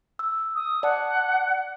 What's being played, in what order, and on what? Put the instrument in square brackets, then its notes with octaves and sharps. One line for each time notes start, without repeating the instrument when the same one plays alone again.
[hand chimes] E6
[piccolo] D#6
[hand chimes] D5 A5 [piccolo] F#5